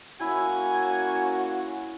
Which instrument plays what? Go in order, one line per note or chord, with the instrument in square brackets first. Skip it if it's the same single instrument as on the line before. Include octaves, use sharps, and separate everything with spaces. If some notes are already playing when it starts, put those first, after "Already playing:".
[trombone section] A#3 C#4 [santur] E4 [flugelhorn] F#4 [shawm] G#5